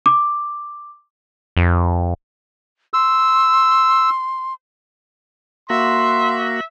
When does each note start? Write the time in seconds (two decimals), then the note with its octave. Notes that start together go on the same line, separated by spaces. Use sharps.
0.06 D6
1.57 F2
2.94 C6 E6
5.70 A#3 F#4 E5 C6